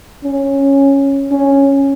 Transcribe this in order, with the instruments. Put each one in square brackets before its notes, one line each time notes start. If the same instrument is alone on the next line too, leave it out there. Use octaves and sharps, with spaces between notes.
[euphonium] C#4
C#4